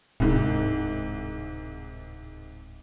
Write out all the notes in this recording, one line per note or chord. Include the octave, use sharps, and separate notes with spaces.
D1 C2 G#2